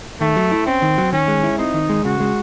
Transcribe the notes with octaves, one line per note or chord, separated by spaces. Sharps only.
D#3 A3
F#3
E4
C4 C#4
D#3
F#3
D#3 C#4
G#3
E4
C4 D#4
D#3
G#3
C#3 F#4
G#3